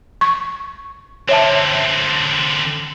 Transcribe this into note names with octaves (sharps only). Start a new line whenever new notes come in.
C#6
D3 C4 C#5 E5 A5